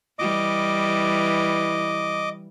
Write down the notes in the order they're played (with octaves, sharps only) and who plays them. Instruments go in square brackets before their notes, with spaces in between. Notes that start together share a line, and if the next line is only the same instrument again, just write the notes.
[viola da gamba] E3 G3 [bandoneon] D#5 D6